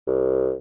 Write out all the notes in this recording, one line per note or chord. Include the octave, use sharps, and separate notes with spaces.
C2